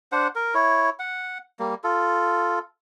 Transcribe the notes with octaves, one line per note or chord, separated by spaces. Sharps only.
D4 C5 F#5
A#4
E4 C#5
F#5
G3 A#3
F4 A4